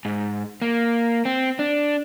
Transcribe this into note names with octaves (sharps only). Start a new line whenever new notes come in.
G#2
A#3
C4
D4